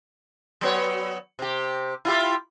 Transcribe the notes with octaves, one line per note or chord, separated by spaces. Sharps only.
F#3 B3 C#5
C3 G4
E4 F4 G4